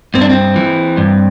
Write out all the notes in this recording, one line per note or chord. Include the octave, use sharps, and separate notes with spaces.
G2 C4
D4
C4
E3
G2